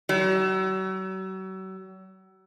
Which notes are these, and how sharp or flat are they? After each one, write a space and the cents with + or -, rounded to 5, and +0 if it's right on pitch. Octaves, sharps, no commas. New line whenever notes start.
F#3 +40